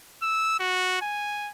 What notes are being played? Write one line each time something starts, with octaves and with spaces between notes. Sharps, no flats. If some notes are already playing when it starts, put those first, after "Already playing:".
E6
F#4
G#5